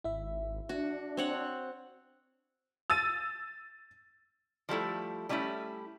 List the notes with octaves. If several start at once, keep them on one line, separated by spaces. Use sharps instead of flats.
G#1 E4 E5
D4 F#4
C4 C#5 F#5
E6 A6 D#7
F3 G3 A3 E4
G3 A3 C#4 D#4 E4